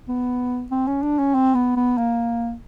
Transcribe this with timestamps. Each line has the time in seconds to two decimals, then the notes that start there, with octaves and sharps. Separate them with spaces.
0.08 B3
0.71 C4
0.87 C#4
1.02 D4
1.19 C#4
1.34 C4
1.55 B3
1.76 B3
1.98 A#3